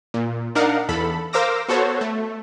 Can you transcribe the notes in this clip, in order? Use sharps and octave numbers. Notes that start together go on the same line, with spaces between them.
A#2
D4 D#4 A#4 F5 F#5
E2 A4 B5
A#4 C5 F5 D6 E6 A#6
B3 F#4 A4 C5 C#5
A3